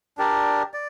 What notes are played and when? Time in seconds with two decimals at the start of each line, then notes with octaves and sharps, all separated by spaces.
0.18 D4 G4 A#4 D5
0.74 D5